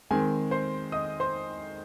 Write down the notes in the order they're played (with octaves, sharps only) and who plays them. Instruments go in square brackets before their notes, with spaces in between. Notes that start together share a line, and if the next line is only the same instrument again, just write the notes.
[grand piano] D#3 G#3 C4 G#4 G#5
C5 C6
D#5 D#6
C5 C6